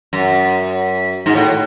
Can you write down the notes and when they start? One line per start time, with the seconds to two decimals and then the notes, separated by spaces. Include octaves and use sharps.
0.13 F#2
1.26 G#2
1.35 A2